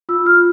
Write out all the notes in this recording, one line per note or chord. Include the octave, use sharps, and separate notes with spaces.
F4 E6
F4 F6